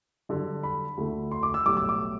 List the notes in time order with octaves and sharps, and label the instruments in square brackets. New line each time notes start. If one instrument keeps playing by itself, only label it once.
[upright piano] G2 D3 F#3
B5
D2 D3 A3
C6
D6
E6
B1 A2 G3 D6
E6
D6